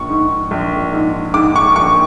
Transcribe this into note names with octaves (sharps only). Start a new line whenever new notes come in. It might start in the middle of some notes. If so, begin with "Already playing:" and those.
Already playing: A#1 C#6
G#2
A#1
G#2
G#2 D6
C#6
A#1 C#6